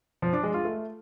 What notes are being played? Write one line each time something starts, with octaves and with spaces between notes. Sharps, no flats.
F3
D4
G#3
F4
A3